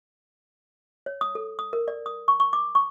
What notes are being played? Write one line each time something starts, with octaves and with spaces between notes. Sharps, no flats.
C#5
D#6
A4
D#6
A#4
D5
D#6
C#6
C#6
D6
C#6